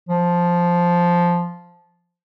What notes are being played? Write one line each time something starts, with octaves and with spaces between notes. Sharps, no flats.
F3